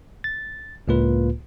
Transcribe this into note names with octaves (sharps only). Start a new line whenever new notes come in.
A6
C#2 A2 A#3 F4 B4